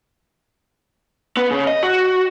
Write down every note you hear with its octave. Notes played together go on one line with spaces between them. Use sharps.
B3
C#3
D#5
F#4